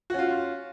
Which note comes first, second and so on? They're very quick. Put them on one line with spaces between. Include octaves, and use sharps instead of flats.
F#4 C#4 F4